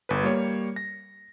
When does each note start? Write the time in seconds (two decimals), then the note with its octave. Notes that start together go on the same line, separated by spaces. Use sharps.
0.09 G1 B4
0.23 G3 A#3 C#5
0.76 A#6